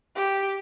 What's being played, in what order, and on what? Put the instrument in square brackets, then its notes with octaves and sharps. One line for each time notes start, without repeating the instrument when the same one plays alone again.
[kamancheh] G4